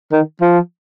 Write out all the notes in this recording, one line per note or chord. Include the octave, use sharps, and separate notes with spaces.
D#3
F3